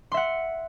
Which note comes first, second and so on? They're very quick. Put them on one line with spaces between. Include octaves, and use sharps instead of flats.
C6 E5 F#5